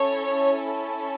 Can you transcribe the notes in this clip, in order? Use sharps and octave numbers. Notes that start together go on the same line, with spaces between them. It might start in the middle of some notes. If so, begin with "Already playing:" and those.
Already playing: C#4 E4 A4 C#5